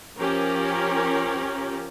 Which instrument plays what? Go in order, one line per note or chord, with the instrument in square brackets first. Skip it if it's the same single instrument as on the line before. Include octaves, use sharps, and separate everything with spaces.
[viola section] F3 C#4 G4 A#4